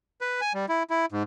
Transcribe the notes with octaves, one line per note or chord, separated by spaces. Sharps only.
B4
G#5
G3
E4
E4
G#2